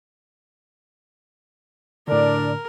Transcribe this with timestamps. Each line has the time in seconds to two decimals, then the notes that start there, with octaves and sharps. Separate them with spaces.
2.08 A2 D3 D4 A#4 D5